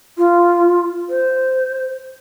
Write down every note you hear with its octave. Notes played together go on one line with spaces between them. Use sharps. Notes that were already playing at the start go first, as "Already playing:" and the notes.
F4
C5